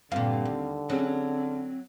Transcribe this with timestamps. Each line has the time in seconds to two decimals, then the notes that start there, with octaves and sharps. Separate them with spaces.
0.12 G2 A#2 D3 C4 F5
0.45 D#2
0.90 F#3 C4 C#4 G#4